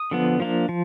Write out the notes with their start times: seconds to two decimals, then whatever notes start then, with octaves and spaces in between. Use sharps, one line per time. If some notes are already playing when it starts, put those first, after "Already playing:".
Already playing: D#6
0.11 D3 F3 B3
0.40 F3 A#3 D4
0.69 F3